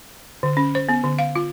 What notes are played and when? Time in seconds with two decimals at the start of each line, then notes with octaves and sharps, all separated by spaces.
0.43 D3
0.57 C#4
0.75 C5
0.89 B3
1.04 D3
1.19 F5
1.36 F4